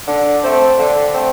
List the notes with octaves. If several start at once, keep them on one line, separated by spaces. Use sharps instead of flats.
D3
A3 C4
D3
A3 C4